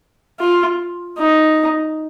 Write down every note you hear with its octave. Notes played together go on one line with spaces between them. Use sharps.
F4
D#4